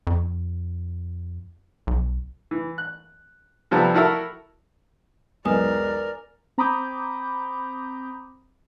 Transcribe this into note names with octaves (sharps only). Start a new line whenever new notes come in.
F2
B1
E3
F#6
C3 F3 G3 B3 A4
E4 F#4 A4 A#4 E5
E1 B1 D#4 A#4 B4 D5 G#5 D#6
C4 A#5 B5 D6 D#6 G6